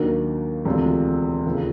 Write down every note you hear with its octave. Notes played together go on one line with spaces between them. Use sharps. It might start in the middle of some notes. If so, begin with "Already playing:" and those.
Already playing: D#2 D#3 F#3 A#3 D4
E1 D2 C3 F3
D#2 C#3 F3